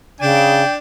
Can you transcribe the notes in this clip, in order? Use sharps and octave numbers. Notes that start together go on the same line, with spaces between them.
C#3 D4 G5